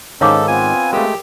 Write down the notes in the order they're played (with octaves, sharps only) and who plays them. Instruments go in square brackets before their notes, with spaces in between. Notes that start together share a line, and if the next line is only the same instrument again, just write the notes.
[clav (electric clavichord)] G#2 D#3 [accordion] E3 C#4 [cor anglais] A4 [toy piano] C#5 F5 D6
[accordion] B3 C4 F4 [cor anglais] G#5
[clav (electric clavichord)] G#3 A3 [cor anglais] G4 [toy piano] A#4